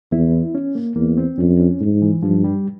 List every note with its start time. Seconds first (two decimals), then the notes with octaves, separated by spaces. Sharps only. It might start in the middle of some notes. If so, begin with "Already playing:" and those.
0.12 E2 E4
0.55 C#4
0.75 A#3
0.96 E2 A#3
1.17 C4
1.38 F2 C#4
1.60 C#4
1.81 G#2
2.02 E3
2.23 G2 F3
2.44 G3